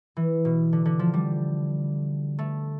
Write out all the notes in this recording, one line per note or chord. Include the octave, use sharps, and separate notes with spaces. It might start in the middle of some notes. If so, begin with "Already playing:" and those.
E3
B2
D3
D3
F3
G3
A3